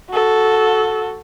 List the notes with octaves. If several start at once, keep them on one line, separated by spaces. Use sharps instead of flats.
F#4 A4